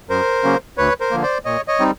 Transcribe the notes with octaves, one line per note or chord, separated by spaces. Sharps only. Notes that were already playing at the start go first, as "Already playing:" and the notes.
F#2 A#4 C5
C#3 F#3 A#3 C#4
D2 B4 C#5
A#4 C5
D3 F3 A#3
C5 D5
A#2 C#5 D#5
C#5 D#5
G3 C4 D#4